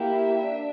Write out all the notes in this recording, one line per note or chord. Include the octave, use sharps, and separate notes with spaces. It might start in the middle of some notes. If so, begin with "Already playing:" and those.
Already playing: A#3 E4 G4 E5
D4